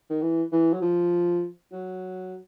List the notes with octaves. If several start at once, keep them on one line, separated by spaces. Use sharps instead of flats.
D#3
E3
E3
F#3
F3
F#3